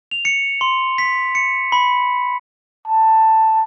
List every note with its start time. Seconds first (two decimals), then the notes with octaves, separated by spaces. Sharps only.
0.11 F7
0.25 C#7
0.61 C6
0.98 B6
1.35 C#7
1.72 B5
2.88 A5